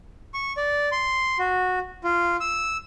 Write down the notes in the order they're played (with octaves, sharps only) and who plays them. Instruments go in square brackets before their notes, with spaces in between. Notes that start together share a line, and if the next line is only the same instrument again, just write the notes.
[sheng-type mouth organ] C#6
D5
C6
F#4
F4
E6